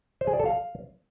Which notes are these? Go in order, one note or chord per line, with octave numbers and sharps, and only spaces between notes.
C5
G#4
D5
A4
F5